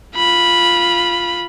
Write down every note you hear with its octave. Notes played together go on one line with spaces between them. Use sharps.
F4 B5